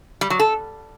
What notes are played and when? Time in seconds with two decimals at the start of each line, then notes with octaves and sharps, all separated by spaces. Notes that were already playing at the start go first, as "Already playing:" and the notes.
0.21 G3
0.30 F#3
0.39 A4